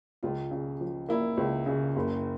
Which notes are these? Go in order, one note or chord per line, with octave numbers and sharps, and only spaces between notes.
C#2 F4
C#3
F3
A#3 E4
C#2
C#3
F#1